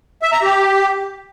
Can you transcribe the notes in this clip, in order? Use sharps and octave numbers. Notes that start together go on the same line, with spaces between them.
E5
A#5
G4